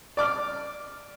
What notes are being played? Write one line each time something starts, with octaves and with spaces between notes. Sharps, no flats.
D5 D6 F6